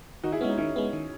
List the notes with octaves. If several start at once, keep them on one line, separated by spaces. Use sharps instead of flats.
D#3 D#4 F#4
E4 G#4
G#3 B3 C#4 D#4
D#3 C#4 E4
G#3 B3
D#3